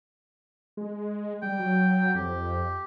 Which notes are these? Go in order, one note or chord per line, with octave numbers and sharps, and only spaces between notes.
G#3
G3 G5
F#3
F2 G4